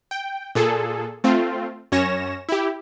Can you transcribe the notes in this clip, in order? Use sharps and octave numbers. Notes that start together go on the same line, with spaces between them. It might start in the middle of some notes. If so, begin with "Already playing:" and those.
G5
A#2 G#4 A4
A3 C4 F4
F#2 C#4 C#5 A#6 E7
E4 G4